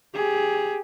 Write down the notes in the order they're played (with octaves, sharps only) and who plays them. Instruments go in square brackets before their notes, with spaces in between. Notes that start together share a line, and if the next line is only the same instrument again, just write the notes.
[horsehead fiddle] G4 G#4